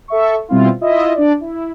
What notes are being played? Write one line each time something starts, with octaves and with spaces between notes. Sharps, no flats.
A4 E5 C#6
B2 G3 C4 E4 F4
E4 F4 D#5 E5
D4 D5
E4